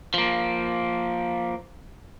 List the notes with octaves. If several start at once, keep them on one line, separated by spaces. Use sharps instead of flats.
F3 A#3